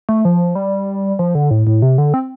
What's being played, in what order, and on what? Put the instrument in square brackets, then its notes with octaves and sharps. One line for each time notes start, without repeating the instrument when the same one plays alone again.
[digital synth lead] A3
F3
G3
F3
D3
A2
A2
C3
D3
C4